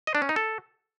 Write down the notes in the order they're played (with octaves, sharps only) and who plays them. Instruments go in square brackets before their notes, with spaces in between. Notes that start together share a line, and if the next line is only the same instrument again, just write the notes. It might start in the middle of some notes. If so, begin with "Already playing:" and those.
[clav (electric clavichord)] D#5
D4
C#4
D#4
A4